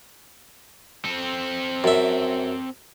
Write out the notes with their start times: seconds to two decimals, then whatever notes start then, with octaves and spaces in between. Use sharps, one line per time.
1.05 C4 A4
1.84 F#2 E5